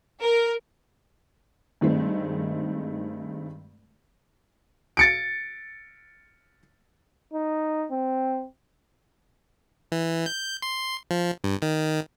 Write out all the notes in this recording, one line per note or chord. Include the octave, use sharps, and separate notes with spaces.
A#4
G2 D#3 G#3 A3 C4
A6 C#7 D7
D#4
C4
E3
G6
C6
F3
G2
D#3